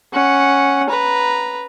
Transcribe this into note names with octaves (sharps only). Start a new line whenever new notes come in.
C#4 F#5
B4 A#5